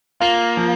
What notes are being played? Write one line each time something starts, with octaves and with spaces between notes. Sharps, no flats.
A#3 F4
F3